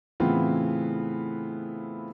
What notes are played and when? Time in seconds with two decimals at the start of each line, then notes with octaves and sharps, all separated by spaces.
0.20 A2 C#3 E3 B3 C4 F4